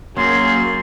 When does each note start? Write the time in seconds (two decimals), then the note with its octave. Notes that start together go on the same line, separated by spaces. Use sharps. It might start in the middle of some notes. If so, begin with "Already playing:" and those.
0.17 F#2 F#3 A#3 G#4 C6